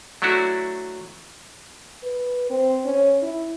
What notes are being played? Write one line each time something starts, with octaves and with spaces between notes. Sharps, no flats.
F#3 A3 D4 E4 F#4
B4
C4
C#4
E4